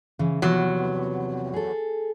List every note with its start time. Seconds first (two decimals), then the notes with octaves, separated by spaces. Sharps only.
0.19 C#3 E3
0.42 E2 C3 F3 F#3 B3
1.54 G#4 A4